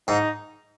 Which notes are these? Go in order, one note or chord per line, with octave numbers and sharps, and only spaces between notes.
G#2 D#4